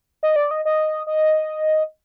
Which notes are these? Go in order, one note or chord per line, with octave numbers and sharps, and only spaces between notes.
D#5
D5
D#5
D#5
D#5